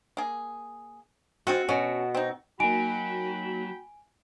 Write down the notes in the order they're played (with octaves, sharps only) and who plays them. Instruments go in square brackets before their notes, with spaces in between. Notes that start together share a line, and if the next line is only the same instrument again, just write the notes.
[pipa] A#3 G#4
[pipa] G#3 C4 F4 [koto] F#4
[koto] B2 [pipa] C#4
[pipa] C4 D#4
[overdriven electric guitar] F#3 [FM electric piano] A#3 D#4 [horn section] F#4 G5 B5 [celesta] G#5 D7